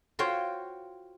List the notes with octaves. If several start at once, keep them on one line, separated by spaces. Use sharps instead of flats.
F4 F#4 C5 C#5 G5